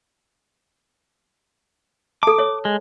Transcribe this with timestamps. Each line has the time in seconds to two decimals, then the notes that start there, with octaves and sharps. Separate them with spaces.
2.23 A4 A5 D6
2.39 C#5
2.65 G#3